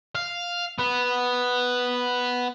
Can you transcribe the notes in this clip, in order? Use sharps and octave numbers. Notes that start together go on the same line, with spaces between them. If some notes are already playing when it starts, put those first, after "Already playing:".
F5
B3